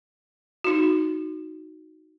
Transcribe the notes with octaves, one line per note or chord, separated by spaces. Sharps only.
D#4 F#4